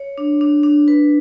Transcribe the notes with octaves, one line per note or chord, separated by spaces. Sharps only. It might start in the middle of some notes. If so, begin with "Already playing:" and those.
Already playing: C#5
D4
D4
D4
B4